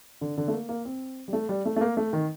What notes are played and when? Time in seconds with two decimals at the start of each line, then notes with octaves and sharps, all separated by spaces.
0.21 D3
0.38 D3
0.48 A3
0.53 A#3
0.69 A#3
0.85 C4
1.28 G3
1.33 A3
1.49 G3
1.65 A3
1.76 A3
1.81 A#3
1.97 A3
2.13 D#3